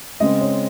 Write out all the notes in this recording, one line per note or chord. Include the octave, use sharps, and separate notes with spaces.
C#3 G#3 C4 D#5
C#5